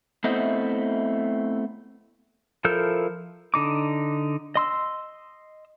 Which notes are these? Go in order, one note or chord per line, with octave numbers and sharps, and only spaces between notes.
A3 B3 C4 E4 C5 D#5
F3 E4 A4 A#4 G6
D3 D#4 D6
D#5 C6 E6